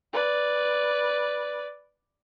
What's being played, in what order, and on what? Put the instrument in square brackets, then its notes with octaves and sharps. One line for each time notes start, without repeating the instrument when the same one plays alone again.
[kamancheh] B4 D5